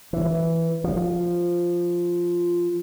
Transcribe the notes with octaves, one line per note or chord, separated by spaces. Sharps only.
E3
F3